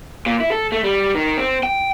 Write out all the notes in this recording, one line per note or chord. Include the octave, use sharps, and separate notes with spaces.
A#2
E4
A4
A3
G3
D#3
C4
G5